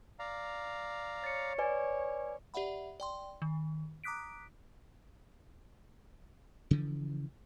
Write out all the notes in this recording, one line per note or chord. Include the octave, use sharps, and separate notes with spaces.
D5 F5 A#5
C#5 A6 C#7
B4 D5 G#5
G4 D5 E5 F#5 B5
D5 G5 C6
D#3
A#5 D6 D#6 F#6 B6 D7
C#3 E3 F3